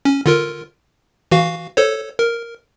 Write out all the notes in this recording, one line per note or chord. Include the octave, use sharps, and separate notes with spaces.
C#4
D3 F4 A#4
E3 F#4 F5
A4 C5 C#5
A#4